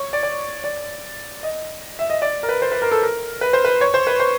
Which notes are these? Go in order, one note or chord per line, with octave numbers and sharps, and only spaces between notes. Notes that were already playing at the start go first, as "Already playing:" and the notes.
Already playing: C#5
D5
D5
D5
D#5
E5
D#5
D5
A#4
B4
C5
B4
A#4
A4
A#4
B4
C5
B4
C#5
C5
B4
C5